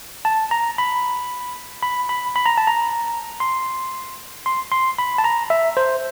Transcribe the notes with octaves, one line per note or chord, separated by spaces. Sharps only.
A5
A#5
B5
B5
B5
B5
A#5
A5
A#5
C6
C6
C6
B5
A5
A#5
E5
C5